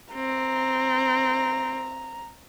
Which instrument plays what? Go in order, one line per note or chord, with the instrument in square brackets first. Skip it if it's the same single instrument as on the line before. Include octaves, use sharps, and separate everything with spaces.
[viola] C4 [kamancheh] A#5